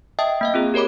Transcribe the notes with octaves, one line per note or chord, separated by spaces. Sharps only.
D#5 E5 G5 A5 D#6
A#3 D#5 F5
C4 F4 G#4
G4 A#4 C#5 B5 D6